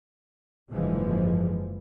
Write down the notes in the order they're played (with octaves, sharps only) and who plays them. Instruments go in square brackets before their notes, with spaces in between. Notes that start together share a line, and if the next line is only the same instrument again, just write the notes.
[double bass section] F#1 G#2 D3 E3 F3 G#3